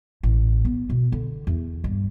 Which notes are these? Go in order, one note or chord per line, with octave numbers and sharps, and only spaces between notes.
A1
B3
B2
D3
E2
G2